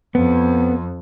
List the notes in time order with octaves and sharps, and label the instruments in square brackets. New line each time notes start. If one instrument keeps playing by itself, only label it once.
[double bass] F2 [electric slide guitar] B3